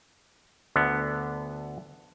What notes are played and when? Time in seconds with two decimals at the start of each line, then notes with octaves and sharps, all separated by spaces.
0.76 D2 D3 B3